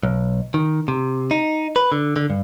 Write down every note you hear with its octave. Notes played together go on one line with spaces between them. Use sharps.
B1
D#3
C3
D#4
B4
D3
D3
G2